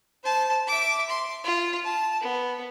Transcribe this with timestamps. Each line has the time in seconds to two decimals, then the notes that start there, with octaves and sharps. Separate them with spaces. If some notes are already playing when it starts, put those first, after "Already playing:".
0.23 C5 A5
0.67 E5 D6
1.09 C6
1.44 F4
1.84 A5
2.20 B3